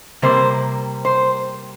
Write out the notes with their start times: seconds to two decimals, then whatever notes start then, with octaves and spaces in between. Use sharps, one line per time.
0.22 C3 G3 A#3 C5
1.05 C5